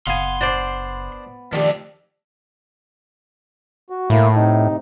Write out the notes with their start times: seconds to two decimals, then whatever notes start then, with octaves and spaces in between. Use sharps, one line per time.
0.07 F#1 B3 F5 G#5 C6
0.41 D4 C5 D5
1.53 D#3 F3 A3 D4 F#4 G4
3.90 F#4
4.10 A2 A#3 E4
4.36 C3 D#4